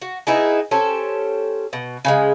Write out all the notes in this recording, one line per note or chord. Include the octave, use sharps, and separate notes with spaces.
F#4
B3 D#4 E4 G#4
C#4 G4 A4 C5
B2
C#3 F#3 G#3